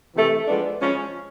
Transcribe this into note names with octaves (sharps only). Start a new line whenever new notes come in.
C3 E3 A3
F3 G#3 B3 D4
F3 G#3 C#4